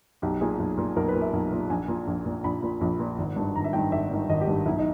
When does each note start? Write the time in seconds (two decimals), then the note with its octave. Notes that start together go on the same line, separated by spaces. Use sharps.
0.22 B1 G4
0.41 A#2 G#4
0.59 B1
0.78 A#2
0.96 B1 A#4
1.08 B4
1.15 A#2
1.21 E5
1.33 B1
1.52 A#2
1.70 A#1 G#5
1.88 A#2
2.07 A#1
2.26 A#2
2.44 A#1 B5
2.63 A#2
2.81 A#1
3.00 A#2
3.18 G#1
3.36 G2 D#3
3.56 G#1 A#5
3.64 E5
3.73 G2 D#3 G5
3.92 G#1 E5
4.11 G2 D#3
4.29 G#1 D#5
4.41 G4
4.47 G2 D#3
4.65 B1 E4
4.79 D#4